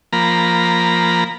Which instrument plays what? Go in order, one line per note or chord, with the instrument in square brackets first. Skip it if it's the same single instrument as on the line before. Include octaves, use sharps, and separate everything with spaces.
[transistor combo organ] F3 A#3 A#5 B5